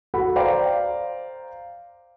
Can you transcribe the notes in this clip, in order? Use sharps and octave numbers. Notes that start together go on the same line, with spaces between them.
F#4 A4 F#5 B5
C5 D5 F5 G5 A#5 D6